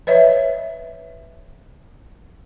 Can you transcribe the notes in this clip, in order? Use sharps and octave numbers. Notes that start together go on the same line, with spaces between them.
B4 C#5 D#5 E5